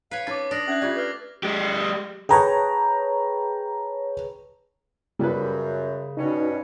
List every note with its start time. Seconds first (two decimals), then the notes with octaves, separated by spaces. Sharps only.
0.11 B4 C#5 F5 C7
0.27 C#4 D#4 C#5 B5 D6 A6
0.51 D4 D#6 A#6 F#7
0.67 C#4 E5 F#6 G#6 F#7
0.82 A3 F4 G4 D5
0.95 B4 F6 C7
1.43 G#3 G4
2.29 G#4 B4 C#5 G5 A5 A#5
5.19 F#2 C#3 G3 B4
6.17 G2 B2 C#4 D#4 F#4